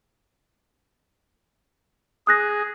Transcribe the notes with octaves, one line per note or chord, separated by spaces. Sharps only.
G#4 D#6 F#6 A#6